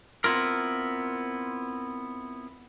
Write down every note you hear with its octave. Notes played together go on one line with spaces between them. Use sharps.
B3 C4 E4 F4 A#4